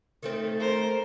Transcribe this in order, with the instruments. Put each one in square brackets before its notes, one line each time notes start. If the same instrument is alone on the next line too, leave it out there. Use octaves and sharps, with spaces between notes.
[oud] D#3 A3 C4
[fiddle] A#4 C5